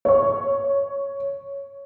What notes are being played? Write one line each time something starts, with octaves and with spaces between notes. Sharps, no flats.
C#5 C#6